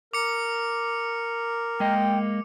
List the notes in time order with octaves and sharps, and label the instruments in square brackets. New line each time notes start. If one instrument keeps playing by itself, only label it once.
[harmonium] A#4 [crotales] D6 C#7
[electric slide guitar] G#3 A#3 D#5 [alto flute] G5